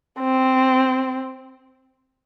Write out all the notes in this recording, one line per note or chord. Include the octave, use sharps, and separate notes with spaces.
C4